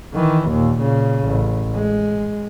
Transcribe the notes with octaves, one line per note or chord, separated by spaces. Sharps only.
D#3 E3
D#2 A#2
A#2 C#3
A1
G#3